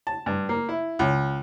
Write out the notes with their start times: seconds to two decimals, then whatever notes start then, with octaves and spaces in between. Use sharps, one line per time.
0.07 A5
0.26 G2
0.49 A#3
0.69 E4
0.99 C#2